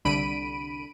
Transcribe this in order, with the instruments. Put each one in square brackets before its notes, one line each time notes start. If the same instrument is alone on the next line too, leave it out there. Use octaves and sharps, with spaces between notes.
[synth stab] C2 D3 B5 D7 D#7